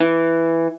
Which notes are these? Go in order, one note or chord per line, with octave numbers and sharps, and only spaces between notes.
E3